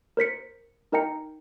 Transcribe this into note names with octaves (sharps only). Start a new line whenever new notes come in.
A#4 C5 B6 C#7
D#4 A#4 D#5 G5 A#5 C#7